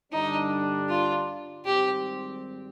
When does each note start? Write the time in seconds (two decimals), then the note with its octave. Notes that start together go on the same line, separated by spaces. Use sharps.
0.12 G2 D3 G3 D4 D#4
0.89 F4
1.65 G#1 G#2 G3 C4 G4